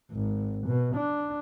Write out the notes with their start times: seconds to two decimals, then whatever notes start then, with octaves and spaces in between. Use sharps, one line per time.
0.12 G#1
0.67 B2
0.96 D4